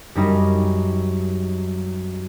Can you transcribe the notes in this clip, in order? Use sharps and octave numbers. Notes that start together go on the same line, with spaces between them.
F#2 G3 D#4